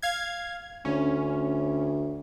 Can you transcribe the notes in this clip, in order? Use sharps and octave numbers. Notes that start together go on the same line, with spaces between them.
F5 G#6
D2 C#4